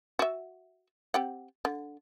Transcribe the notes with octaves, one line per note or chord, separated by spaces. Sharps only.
F#4 E5
C4 G4 F#5
D3